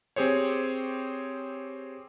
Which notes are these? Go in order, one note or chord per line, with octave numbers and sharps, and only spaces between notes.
C4 G4 G#4 C5 C#5